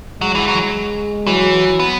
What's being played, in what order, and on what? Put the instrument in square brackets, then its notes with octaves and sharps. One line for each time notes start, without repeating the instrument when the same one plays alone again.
[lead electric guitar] F#3 [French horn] G#3
[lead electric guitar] E3
F#3
[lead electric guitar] E3 [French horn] F#3
[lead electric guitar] B3